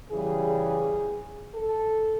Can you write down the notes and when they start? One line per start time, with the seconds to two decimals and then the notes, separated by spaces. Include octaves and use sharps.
0.11 C#3 E3 G3 G#4
1.55 A4